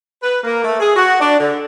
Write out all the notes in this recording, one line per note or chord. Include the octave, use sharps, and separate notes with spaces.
B4
A#3
A3
G#4
F#4
D4
D3